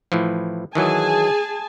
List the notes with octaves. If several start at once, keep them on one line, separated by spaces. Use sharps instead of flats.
A2 E3 F3
D#3 E3 F#3 G#4 G#5 A5